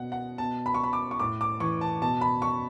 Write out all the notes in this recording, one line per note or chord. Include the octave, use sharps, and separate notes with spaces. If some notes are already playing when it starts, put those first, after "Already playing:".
Already playing: B2 F#5
F#5
B2 A5
B5
C#6
B5
D6
C#6
A2 D6
D6
E3 C#6
A5
B2 A5
B5
C#6